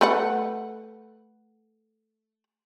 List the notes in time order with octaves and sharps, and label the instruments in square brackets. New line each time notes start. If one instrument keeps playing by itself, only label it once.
[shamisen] A3 B4 F#5